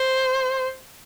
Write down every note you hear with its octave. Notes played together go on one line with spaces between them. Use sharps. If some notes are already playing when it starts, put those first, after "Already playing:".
Already playing: C5